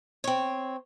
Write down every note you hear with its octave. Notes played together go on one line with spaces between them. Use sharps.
C4 C#5